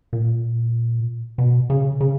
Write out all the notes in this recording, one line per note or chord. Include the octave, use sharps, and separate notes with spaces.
A#2
B2
C#3
C#3